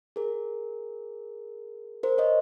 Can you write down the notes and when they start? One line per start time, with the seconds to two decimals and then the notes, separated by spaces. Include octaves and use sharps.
0.16 G#4 A#4
2.03 A#4 C5
2.18 C#5 D#5